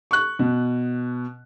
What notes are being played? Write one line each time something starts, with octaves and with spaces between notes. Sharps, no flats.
C#6 F#6
B2